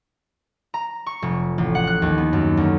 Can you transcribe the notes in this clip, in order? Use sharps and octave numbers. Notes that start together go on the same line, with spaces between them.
A#5
C#6
F1
A1
F#5
F#6
D#2
B3
F#2
D2